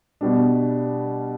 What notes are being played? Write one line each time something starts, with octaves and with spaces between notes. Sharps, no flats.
B2 G3 D4